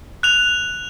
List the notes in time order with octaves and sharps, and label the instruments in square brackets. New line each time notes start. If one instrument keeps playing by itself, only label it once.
[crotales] F#6 F7